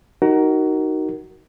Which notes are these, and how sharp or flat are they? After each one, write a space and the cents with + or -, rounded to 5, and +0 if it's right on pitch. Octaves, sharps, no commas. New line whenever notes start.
D#4 +5 F#4 +25 A#4 +0